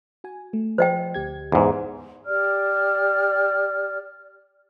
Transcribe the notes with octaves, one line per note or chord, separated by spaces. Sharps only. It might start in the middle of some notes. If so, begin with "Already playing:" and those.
F#4 G#5
A3
F3 C5 D#5 G5
D2 G4 G#6
E2 G#2
G4 D5 F6